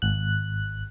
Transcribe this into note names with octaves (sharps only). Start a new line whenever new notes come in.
G#1 F#6